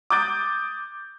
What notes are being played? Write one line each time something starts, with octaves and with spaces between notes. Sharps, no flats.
D6 D#6 F#6 G6 A6 D7